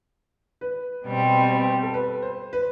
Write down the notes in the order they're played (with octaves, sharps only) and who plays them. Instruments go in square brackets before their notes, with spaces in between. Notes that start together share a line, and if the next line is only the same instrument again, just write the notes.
[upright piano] B4
[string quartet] B2 G3 C4
[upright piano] A4
B4
C5
B4